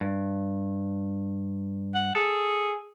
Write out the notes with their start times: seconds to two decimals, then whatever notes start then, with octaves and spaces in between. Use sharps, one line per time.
0.01 G2
1.94 F#5
2.15 G#4 A4